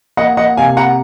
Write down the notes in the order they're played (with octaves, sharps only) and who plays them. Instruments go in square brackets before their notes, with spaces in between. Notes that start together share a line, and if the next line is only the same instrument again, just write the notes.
[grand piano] A#3 D#5 F#5
D#5 F#5
C3 F5 G#5
F#5 A#5